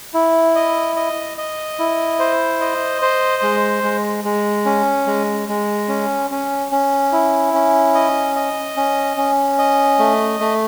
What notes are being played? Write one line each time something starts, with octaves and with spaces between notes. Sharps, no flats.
E4
D#5
D#5
D#5
E4
C5
D#5
C5
G#3
G#3
G#3
C#4
G#3
G#3
C#4
C#4
C#4
E4
C#4
D#5
D#5
C#4
C#4
D#5
A3
A3